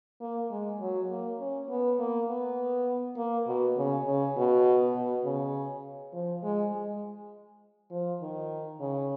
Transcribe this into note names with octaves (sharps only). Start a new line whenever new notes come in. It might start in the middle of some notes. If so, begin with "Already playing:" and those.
A#3
G#3
F#3
A#3
C#4
B3
A#3
B3
A#3
B2
C#3
C#3
B2
B2
C#3
F3
G#3
G#3
F3
D#3
C#3